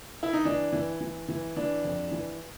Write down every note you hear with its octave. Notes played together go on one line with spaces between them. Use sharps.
E4
D#4
E3 D4
E3
E3
E3
E3 D4
F2
E3